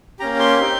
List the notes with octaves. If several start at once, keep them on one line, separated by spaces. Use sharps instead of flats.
A#3 C#4 G4 A#5
C6
C4 D#4 G4